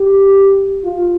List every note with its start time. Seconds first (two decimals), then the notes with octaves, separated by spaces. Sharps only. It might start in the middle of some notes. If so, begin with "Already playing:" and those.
Already playing: G4
0.85 F4